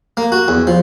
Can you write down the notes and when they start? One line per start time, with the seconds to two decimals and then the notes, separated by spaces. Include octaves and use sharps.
0.17 A#3
0.32 F#4
0.48 E2
0.67 F3